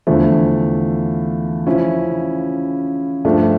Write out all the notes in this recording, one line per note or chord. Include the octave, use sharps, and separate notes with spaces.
E2 D3 F3 A3
C#3 F3 C#4 E4
G2 F3 A3 D4